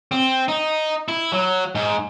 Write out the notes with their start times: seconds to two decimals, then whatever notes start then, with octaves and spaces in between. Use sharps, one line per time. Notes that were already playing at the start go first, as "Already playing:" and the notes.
0.12 C4
0.48 D#4
1.08 E4
1.32 F#3
1.75 G#2